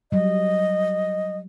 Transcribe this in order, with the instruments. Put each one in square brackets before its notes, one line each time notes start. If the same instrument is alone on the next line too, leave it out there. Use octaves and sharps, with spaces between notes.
[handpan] F#3 G3 [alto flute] D#5